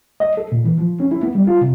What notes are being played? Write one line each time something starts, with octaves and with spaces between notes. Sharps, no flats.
D#5
A4
A#2
E3
F3
C#4
E4
B3
G3
F4
C3